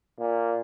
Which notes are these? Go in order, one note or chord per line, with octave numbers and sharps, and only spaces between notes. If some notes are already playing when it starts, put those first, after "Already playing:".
A#2